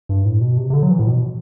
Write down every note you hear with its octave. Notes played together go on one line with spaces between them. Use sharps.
G2
A2
B2
C3
C3
D3
F#3
E3
A2
B2